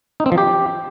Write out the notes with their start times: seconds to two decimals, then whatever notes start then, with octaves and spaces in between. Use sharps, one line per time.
0.20 D#4
0.26 C4
0.32 F3
0.38 G4